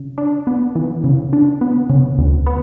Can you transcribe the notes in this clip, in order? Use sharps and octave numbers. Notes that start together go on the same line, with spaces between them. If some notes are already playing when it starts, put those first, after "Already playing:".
Already playing: C#3
D4
B3
E3
C#3
D4
B3
C#3
D2
B3